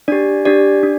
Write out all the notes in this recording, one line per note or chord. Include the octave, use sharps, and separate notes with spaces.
D4 G4 D5
D4 G4 D5
D4